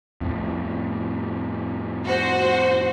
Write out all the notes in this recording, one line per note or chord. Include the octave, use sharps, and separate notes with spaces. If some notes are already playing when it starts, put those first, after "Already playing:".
F2 A2
F#4 C5